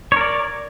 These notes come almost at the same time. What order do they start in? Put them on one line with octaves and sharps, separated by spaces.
C#5 A#4 D5